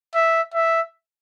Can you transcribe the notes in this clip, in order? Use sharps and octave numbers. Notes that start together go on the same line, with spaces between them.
E5
E5